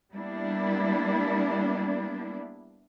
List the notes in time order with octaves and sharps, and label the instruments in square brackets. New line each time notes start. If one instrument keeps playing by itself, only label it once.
[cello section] G3 A#3 B3 D4 E4